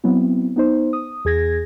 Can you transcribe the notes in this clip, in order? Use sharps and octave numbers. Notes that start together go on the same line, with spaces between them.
F#3 B3 C4 E4
B3 D#4 C5
D#6
E2 G#4 G#6 A#6